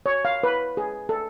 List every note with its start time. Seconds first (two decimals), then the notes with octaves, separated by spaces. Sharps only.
0.06 C#5
0.25 F5
0.43 B4
0.77 G#4
1.09 A4